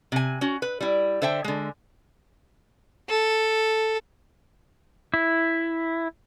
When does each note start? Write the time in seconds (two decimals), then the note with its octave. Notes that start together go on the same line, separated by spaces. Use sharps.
0.12 C3 G#5
0.41 C#4 F#4
0.62 B4
0.81 G3 E4
1.22 D3 C5 E5 G5
1.44 D3 G#3
3.09 A4
5.14 E4